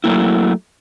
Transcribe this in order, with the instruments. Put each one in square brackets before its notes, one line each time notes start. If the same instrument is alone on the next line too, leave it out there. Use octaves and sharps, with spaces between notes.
[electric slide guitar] F#3 A3 A#3 E4